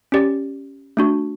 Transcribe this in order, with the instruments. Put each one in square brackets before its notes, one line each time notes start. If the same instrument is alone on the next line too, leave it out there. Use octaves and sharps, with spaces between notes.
[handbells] C#4 G4 D5
A3 D4 F#4